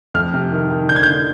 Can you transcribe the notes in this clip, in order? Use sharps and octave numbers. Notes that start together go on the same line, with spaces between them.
F2 F6
C3
D#3
D#3
D3 G6
G#6
D3 G6